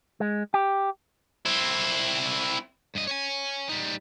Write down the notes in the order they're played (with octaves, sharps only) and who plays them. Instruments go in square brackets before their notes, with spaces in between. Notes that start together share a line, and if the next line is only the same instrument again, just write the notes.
[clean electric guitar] G#3
G4
[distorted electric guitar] C4 E4
[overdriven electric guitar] G2 D#5
C#5 G#5
G3 D#4